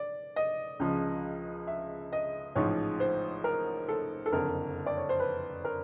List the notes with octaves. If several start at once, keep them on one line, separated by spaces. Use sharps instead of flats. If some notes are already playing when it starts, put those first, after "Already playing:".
Already playing: D5
D#5
C#2 C#3 F3
E5
D#5
A1 G#2 F3 C#5
C5
A#4
A4
A4
F#1 F2 D3 A#4
D5
C#5
C5
B4
A#4